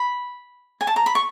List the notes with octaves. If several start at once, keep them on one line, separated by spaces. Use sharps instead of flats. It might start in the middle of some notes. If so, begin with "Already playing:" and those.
Already playing: B5
G#5
A5
A#5
B5
C#6